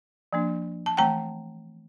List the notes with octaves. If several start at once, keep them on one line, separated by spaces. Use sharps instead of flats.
F3 A#3 D4
A5
E3 A3 C4 G5 A#5